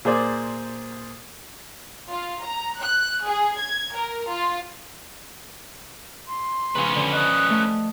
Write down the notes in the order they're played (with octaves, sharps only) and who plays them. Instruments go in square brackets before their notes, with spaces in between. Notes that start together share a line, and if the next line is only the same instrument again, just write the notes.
[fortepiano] A#2 G#4 C5 D5
[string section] F4
A#5
F#6
G#4
G#6
A#4
F4
[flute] C6
[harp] C#3 F3 [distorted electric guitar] C#4 B4
[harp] D3
[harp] D#5 D#6 [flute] F#6
[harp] A3